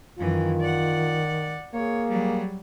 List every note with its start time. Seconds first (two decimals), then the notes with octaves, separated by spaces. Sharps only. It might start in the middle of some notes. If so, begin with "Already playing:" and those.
0.19 F#2 D#3 E3 F4
0.60 D5 F#5
1.74 A#3 G#4 C#5
2.08 F#3 G3